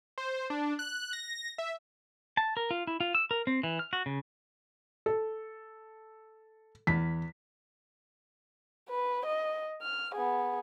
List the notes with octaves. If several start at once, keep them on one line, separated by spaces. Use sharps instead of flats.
C5
D4
F#6
A#6
E5
A5
A#4
F4
E4
F4
E6
A#4
C4
E3
F6
F#4
C#3
A4
E2 B6
B4
D#5
F6
B3 G#4